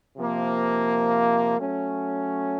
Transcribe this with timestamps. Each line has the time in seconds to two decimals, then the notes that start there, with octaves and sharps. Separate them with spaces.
0.17 C3 F3 A#3
1.57 F#3 A3 C#4